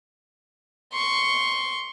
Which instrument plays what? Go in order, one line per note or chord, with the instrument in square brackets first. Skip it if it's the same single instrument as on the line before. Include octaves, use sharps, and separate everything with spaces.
[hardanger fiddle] C6 C#6